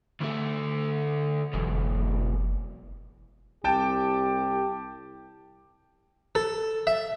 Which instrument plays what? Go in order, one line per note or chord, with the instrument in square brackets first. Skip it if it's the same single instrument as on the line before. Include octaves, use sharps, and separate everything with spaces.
[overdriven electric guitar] D2 A3
[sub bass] F1 [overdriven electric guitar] B1 E2
[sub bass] F#1
[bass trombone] C2 [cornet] G4 [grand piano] G5 A5
[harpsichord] A4
E5